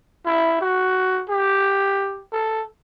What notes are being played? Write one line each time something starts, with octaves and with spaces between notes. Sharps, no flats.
E4
F#4
G4
A4